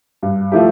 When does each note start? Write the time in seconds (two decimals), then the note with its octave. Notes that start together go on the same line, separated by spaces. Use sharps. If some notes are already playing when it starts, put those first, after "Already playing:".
0.23 G2
0.52 F3 A3 E4 G4